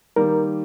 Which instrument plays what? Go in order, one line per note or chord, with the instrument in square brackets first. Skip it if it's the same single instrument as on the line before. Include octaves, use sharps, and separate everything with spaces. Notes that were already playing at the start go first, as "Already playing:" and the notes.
[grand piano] D#3 G3 A#3 [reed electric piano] A#4